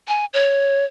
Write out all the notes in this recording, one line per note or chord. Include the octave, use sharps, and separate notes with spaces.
G#5
C#5